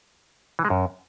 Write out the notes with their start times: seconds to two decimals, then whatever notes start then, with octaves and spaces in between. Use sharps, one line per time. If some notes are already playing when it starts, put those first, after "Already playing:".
0.59 E3
0.65 G#3
0.70 F#2